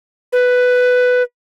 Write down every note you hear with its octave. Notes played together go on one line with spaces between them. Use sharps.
B4